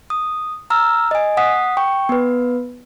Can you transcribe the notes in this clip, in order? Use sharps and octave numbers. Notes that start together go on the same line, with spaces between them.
D#6
A#5 E6 F6
D#5 G#5
F#5 D#6 B6
G5 C#6
B3 B4